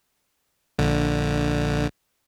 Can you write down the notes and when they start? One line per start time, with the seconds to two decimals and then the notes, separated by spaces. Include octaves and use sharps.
0.79 A#1 D3